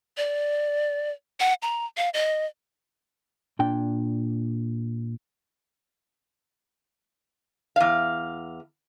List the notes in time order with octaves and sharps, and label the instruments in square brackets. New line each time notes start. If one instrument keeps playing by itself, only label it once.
[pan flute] D5
F#5
A#5
F5
D#5
[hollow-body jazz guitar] A#2 D4 G5
[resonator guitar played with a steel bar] E2 F5